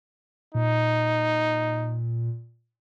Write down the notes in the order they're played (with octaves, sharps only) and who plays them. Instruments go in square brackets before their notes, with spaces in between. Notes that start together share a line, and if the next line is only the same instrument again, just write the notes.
[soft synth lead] A#2 [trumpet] D#4